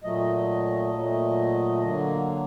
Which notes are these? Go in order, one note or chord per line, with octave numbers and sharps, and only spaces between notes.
A#2 F#3 A3 D#5
A#2 F#3 A3
D3 F#3 A#3